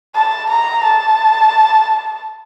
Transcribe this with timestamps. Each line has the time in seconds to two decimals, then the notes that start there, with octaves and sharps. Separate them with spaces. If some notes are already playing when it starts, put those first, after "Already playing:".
0.15 A5
0.50 A#5
0.84 A5